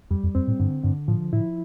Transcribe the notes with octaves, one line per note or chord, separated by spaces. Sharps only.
F2 G3
F2
F2 C4
A2
G2 D3
G2 D3
A2 F3
A2 E4